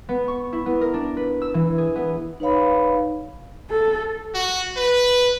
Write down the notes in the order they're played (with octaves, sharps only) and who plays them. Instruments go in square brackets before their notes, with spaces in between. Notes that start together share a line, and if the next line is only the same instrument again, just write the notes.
[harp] B3
C#6
E4
B3
A#4
D4
B4
E6
E3
G#4
B3
[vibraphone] D#4 B4 C#5 F5 B5
[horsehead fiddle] A4
[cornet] F#4
B4